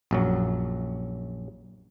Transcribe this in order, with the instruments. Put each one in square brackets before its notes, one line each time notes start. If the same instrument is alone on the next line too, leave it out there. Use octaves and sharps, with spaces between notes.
[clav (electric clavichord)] A#1 F#2 F#3